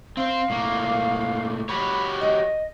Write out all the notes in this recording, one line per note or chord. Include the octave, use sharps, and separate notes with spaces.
C4 C5 F5
A2 A#3
F#4 G4 C#5 B5
D#5